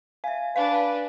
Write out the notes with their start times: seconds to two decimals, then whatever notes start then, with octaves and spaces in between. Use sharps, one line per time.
0.24 E5 F5 G#5
0.56 D4 B4 F5